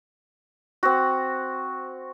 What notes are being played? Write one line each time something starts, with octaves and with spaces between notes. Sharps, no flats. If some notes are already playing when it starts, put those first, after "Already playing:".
C4 F#4